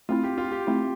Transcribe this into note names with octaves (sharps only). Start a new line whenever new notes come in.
A3 C4 E4 F4
G4
F4
G4
A3 C4 E4